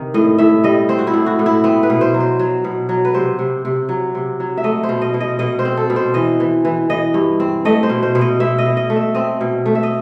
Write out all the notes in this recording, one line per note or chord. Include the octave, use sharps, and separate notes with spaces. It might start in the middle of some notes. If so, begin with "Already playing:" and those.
Already playing: C3 D#3
A2 D#5
A2 E5
G3 D#5
C4 C5
F#4
E4
A2
F#4
A2
E4
B3 C4
B4
B2
C5
F#3
C5
F#3
B2
F#3
B4
C3 C5
C3
C3
F#3
C3
F#3
E5
A3 D#5
C5
B2
D#5
B2
D#5
B2 D#5
C5
C4
A4
B2
C5
E3 D#5
E3
E3
E3 D#5
G2
C4
A3 D#5
C5
B2
C5
B2
D#5
B2 E5
D#5
B2
D#5
A3
E5
C4 D#5
B2
A3
E5
D#5